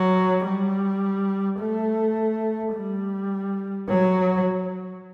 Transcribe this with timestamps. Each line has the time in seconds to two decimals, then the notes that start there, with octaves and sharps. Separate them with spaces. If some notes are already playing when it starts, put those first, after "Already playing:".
Already playing: F#3
0.44 G3
1.59 A3
2.73 G3
3.88 F#3